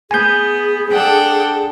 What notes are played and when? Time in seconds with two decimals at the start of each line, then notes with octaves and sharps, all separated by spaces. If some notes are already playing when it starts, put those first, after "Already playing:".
0.11 B3 G#4 G#5 G6
0.91 D4 A4 F#5 G5